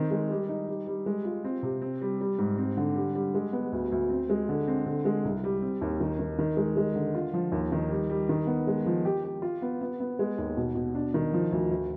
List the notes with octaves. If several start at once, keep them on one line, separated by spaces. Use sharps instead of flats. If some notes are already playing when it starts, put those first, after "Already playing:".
Already playing: D#3 C4
G#3
G3
D#4
G3
G3
G#3
F4
C4
C3
C4
G3
G3
G#2
C4
D3
G3
G3
G#3
B3
D2
D2
C4
G#3
D3
C4
D3
G#3
C2
G3
C4
D#2
D#3
D#3
D#3
G#3
G#3
D3
F4
F3
D#2
D#3
G3
G3
D#3
B3
G#3
F3
G4
G4
F4
B3
B3
B3
G#3
D#2
B2
B2
D4
D#3
F3
D2
D2